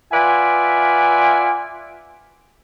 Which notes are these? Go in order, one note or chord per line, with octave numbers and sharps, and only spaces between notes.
F4 B4 D5 E5 F#5 G#5